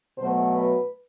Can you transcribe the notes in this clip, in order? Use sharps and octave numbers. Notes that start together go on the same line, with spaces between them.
B2 F#3 A3 C5
B4